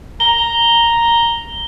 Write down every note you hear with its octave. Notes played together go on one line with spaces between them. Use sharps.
A#5 G7